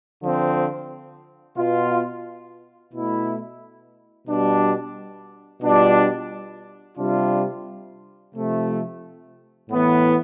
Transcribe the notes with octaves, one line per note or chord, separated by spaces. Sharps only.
D3 F3 C4
B2 B3 F4
B2 A3 E4
B2 G3 D4
B2 G3 D4 F4
C3 G3 D4 F4
C3 F3 A3
A2 E3 B3